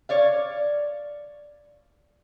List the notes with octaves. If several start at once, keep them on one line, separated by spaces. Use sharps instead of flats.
C#5 D5 F5